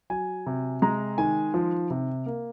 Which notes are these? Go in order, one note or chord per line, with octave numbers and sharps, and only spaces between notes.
F#3 G#5
C3
G#3 A#5
D#3 G#5
F3
C3
A#3